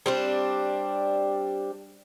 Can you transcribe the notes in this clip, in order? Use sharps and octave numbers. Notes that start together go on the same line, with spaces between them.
G3 C4 D4